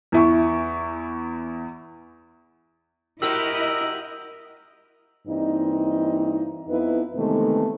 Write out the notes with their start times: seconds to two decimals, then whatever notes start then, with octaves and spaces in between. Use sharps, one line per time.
0.12 E2 E4 C#6
3.22 E4 F#4 G4 A#4 C5 D#5 E6
5.26 G2 E3 A#3 C4 D#4
6.68 F2 B3 D#4 E4 B4
7.15 C3 D#3 E3 G#3 A3 B3